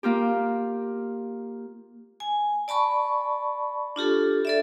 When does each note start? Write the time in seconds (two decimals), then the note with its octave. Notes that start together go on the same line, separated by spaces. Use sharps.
0.03 A#3 F4 G4
2.20 G#5
2.68 D5 A5 B5 C#6
3.96 D4 F4 G4 A4
4.45 A4 D5 E5